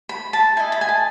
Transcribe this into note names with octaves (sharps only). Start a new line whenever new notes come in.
B5
A5
E4 A4 D#5 G#5
B5
G#5
A5